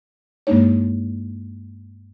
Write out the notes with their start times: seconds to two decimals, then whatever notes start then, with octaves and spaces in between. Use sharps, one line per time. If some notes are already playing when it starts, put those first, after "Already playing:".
0.47 G2 G#3 A#3 D4 D#4 C#5